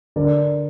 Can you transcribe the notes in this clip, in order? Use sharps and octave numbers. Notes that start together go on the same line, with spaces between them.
D3 A#4 D5